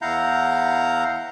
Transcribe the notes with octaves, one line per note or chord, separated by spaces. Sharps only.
E2 E4 F5 F#5 A#5 G6